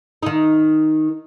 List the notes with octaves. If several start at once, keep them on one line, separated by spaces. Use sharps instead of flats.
D#3 D#4